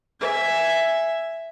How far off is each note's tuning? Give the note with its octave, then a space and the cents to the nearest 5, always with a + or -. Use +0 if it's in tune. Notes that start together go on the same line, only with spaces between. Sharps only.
E5 +5 G#5 +0